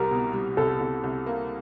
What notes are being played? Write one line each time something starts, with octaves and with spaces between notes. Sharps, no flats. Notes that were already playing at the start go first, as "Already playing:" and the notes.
Already playing: C2 G3 A#4
B2
G3
C2 A4
C2
C2
A#3